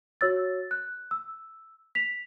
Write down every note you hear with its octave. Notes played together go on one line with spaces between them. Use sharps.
F#4 C#5 E6 A6
F#6
E6
B6 F7